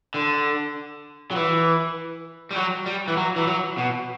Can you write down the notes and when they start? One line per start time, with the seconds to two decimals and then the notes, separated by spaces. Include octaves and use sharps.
0.14 D3
1.31 F#3
1.36 E3
2.51 G3
2.56 F#3
2.86 G3
3.08 E3
3.17 F#3
3.36 E3
3.47 F#3
3.78 B2